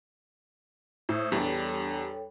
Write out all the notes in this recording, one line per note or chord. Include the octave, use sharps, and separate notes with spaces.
A2 C5 D#6 E6
E2 G3 D4 A4 C#5 G5